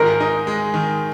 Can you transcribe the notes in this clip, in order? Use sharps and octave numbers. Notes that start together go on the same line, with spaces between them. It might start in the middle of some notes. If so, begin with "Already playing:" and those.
Already playing: G#2 D#3 G#3 A#4
D#4
G#3
D#3